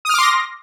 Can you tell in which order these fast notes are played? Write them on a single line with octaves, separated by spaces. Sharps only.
D#6 F6 D6 C6 A#6